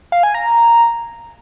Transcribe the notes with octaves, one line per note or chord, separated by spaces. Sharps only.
F5
G#5
A#5